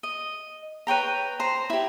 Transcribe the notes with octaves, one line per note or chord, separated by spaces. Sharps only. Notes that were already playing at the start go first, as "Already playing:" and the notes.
D#5
B4 C#5 G5 A#5
C5 A#5
E4 G4